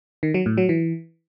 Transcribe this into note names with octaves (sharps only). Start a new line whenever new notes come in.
D#3
F#3
A2
F#3
E3